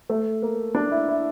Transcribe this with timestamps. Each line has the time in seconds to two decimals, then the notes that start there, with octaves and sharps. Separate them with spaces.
0.10 A3
0.42 A#3
0.75 D4
0.91 E4
1.08 E4